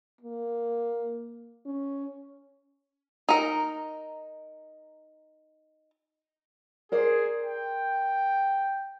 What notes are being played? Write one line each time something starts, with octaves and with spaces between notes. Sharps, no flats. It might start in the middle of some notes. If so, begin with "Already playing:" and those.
A#3
C#4
D#4 A#4
G#4 A#4 C5 D5
G5